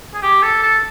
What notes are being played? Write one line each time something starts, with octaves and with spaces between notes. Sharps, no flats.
G#4
G4
A4
A4